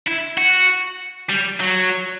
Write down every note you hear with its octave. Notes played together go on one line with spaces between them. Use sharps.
E4
F#4
G3
F#3